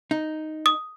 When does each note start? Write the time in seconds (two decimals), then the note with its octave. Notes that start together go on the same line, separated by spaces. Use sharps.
0.11 D#4
0.66 D#6